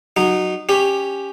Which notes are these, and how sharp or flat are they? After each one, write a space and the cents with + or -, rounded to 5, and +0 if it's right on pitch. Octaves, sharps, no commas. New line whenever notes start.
F#3 +0 D#4 -15
C#4 +0 G4 +10